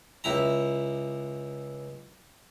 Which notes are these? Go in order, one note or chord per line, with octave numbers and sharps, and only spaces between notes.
C#2 E4 A#5